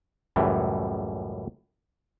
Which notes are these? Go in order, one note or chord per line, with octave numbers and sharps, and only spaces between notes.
C#2 F#2 A2 E3 G3